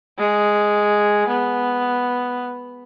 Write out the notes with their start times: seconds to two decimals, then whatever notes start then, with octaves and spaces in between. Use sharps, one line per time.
0.19 G#3
1.28 B3